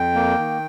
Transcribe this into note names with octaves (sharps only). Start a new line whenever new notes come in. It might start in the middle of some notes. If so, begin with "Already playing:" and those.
Already playing: F2 G5
A#3
D#3